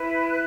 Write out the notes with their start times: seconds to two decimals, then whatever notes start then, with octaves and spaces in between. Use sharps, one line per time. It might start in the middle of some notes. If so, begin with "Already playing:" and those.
Already playing: E4 B4
0.28 F#6